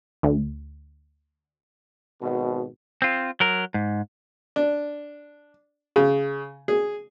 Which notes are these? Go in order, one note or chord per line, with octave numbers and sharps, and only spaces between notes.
D2
G#1 B2
C4 F4
F#3 A#4
G#2
D4
C#3
G#4